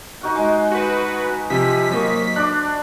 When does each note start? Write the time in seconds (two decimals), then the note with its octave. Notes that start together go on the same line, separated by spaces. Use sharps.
0.21 D#4 F#4 F#5
0.36 G#3
0.72 F#4 B4
1.50 C3 F3 C4 B6
1.90 F#3 A#3 C5 D#5 C#6
2.36 D4 D6 F#6